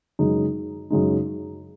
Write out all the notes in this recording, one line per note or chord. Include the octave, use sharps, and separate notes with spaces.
F#2 C#3 G#3 D#4
F#2 C#3 G#3 D#4